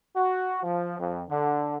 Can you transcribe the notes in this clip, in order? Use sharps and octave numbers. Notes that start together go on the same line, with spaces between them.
F#4
F3
F2
D3